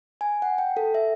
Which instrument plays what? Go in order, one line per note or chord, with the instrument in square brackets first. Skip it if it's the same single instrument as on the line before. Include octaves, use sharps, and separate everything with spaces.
[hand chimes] G#5
F#5
G5
A4
E5